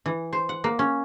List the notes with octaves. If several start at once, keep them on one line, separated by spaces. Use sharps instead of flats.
E3
C5
F#5
A#3
C#4